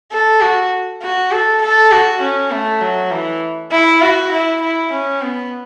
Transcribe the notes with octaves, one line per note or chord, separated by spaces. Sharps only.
A4
F#4
F#4
A4
A4
F#4
C#4
A3
F#3
E3
E4
F#4
E4
E4
C#4
B3